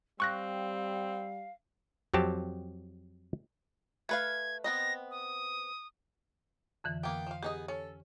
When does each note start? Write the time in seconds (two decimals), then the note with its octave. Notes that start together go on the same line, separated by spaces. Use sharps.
0.20 G3 C4 F5 C#6 F#6 A#6
2.14 F2 F#3 C4 G4 A5
4.09 A3 B4 F5 G#6
4.64 B3 C4 D#5 A#6
5.11 D#6
6.84 F2 D3 E3
7.03 A#3 B3 G5
7.27 F3 F5
7.43 B3 D#4 G4 G#4 D#5
7.68 C#4 A4 C#5